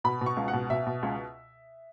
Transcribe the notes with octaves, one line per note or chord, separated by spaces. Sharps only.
B2 B5
B2
C#6
C#2
F#5
B2
B2 E5
B2
C#2